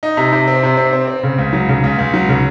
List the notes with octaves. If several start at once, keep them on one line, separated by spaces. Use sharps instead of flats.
D#4
C3
C3
C4
C3
C4
C4
C4
C#3
C#2
F#3
C#3
C#2
C#2
F#3
C#3